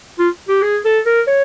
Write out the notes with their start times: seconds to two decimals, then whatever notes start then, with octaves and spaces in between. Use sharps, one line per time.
0.19 F4
0.48 G4
0.62 G#4
0.85 A4
1.06 A#4
1.27 C#5